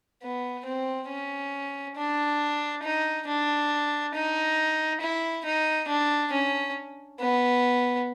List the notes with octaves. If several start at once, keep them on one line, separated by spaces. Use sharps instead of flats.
B3
C4
C#4
D4
D#4
D4
D#4
E4
D#4
D4
C#4
B3